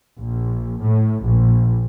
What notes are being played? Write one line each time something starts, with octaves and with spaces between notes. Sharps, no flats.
A#1
A2
A#1